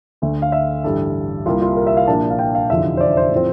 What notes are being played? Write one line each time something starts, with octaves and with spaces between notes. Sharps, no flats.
D2 D3 A3
F5
E5
A1 G2 D3 G3 A4
C2 C3 G3 A#3 F4
F4
A#4
E5
F5
A#1 A#2 F3 A#3 D4 A5
F5
G5
F5
F1 E2 D3 F3 E5
C5
D5
C5
A2 F3 C4